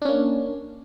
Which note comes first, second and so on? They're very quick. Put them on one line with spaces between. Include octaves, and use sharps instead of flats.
D4 C#4 A#3